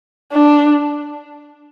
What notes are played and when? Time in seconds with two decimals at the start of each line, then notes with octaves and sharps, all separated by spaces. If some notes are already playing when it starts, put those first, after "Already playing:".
0.33 D4